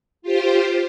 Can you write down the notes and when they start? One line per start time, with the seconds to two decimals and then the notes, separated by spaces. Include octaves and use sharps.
0.22 F4 G4 C5